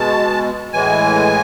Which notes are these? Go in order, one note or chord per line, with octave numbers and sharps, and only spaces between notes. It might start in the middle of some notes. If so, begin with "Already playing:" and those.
Already playing: B2 G#3 A5
A2 E3 G#3 G#5